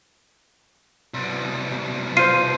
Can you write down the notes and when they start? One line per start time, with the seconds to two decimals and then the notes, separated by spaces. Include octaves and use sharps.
1.14 C2 B2
2.17 F4 C5 C7 D#7